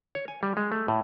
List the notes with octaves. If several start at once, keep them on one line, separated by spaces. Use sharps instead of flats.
C#5
G#5
G3
G#3
A3
A2